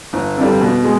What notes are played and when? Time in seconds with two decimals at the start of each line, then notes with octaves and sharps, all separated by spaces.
0.13 G1
0.37 F2 D3 G3
0.61 B2
0.84 G#3